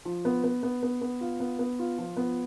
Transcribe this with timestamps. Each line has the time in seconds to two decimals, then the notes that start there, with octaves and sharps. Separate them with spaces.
0.05 F3
0.25 B3
0.44 B3
0.63 B3
0.83 B3
1.01 B3
1.21 F4
1.40 B3
1.59 B3
1.79 F4
1.98 F3
2.17 B3